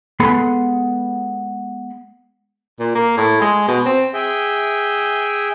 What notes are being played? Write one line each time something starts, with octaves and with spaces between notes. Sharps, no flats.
G#3 B3 A4 B5 C6
A#2
A#3
A2
G#3
B2
C4
G#4 E5 G5